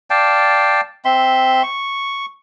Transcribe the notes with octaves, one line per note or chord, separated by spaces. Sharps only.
D5 F5 G5 A5
C4 E5 C6
C#6